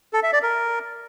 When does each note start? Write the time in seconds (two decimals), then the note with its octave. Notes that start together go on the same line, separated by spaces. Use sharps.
0.13 A4
0.23 E5
0.33 D5
0.43 A#4